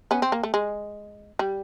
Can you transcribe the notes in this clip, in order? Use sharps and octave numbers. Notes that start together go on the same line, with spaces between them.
B3 C#4
C4
A#3
A3
G#3
G3